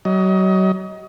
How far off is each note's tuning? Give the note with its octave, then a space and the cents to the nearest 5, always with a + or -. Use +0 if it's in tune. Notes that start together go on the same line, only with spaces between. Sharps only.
F#3 +35 D#5 +25